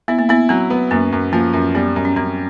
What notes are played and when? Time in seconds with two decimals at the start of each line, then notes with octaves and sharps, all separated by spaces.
0.08 B3 E4
0.19 A#3
0.29 B3 E4
0.49 F#3 C4
0.70 B3
0.91 F#2 A#3
1.12 F#2
1.33 F3 A#3
1.53 F#2
1.75 G3 B3
1.96 F#2
2.05 C#4
2.16 F#2 C4